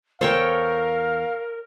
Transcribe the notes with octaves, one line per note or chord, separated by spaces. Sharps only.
E2 A4 A#4 C5 C#5 F5 G5